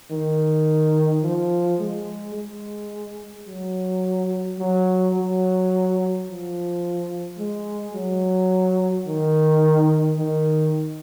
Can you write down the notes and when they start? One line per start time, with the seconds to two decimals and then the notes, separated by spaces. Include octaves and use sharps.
0.12 D#3
1.24 F3
1.80 G#3
2.35 G#3
3.47 F#3
4.59 F#3
5.15 F#3
6.27 F3
7.38 G#3
7.94 F#3
9.07 D#3
10.18 D#3